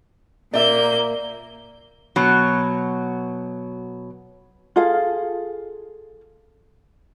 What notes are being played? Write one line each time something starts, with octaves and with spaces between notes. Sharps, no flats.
A#2 A#3 D5 E5 G6
B2 F#3
F4 G#4 A4 F5